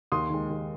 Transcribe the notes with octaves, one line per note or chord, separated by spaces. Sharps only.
D#2 C6 D#6
D#3 G#3
D#2